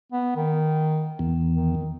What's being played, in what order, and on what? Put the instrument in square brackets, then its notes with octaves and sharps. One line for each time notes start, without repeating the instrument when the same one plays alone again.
[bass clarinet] B3
D#3
[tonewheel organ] E2
[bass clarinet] D#3